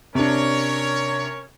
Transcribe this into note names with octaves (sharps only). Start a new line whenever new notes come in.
C3 C#4 D4 A#4 C#5